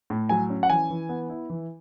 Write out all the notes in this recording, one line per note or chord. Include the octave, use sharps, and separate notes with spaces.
A2
F#3 G#5
C#4
F#5
E3 G#5
E3
B3
E4
E3